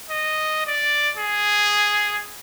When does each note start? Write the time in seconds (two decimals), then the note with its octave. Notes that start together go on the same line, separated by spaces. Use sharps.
0.10 D#5
0.66 D5
1.17 G#4